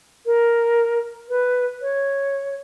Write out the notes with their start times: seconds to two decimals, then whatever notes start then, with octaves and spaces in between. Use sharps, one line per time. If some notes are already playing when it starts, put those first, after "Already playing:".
0.26 A#4
1.29 B4
1.82 C#5